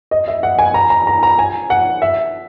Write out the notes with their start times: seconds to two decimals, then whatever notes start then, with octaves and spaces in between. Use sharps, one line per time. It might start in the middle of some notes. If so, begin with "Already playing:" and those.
0.11 D#5
0.28 E5
0.43 F#5
0.59 G#5
0.74 A#5
0.90 A#5
1.07 A#5
1.23 A#5
1.39 G#5
1.70 F#5
2.02 E5